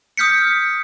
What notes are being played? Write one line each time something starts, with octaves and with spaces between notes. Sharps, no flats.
D#6 F6 G6 B6 C#7